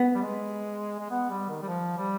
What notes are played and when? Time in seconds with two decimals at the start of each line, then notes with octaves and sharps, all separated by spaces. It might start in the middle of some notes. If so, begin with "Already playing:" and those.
Already playing: B3
0.15 G3
0.22 G#3
0.99 G#3
1.10 B3
1.30 G3
1.49 D#3
1.62 G3
1.68 F3
1.98 G3